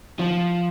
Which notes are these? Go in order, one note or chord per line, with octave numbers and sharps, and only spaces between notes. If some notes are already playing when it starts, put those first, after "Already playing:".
F3